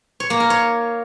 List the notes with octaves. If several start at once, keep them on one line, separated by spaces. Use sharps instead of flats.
C#5
A#3
A#4
C#5